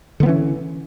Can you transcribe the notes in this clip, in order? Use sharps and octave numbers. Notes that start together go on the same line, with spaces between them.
D3 E3 B3 C#4